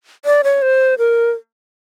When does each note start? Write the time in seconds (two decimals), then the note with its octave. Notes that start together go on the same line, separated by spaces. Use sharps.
0.25 D5
0.44 C#5
0.62 C5
0.98 A#4